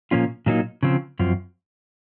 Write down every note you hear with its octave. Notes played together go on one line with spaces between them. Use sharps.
A#2 F3 A#3 C#4 F4
A#2 F#3 A#3 D#4
C#3 F3 C4
F#2 F3 C4